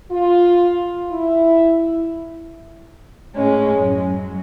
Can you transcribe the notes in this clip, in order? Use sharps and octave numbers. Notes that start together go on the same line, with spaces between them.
F4
E4
A2 G#3 C#4
F#2
F#3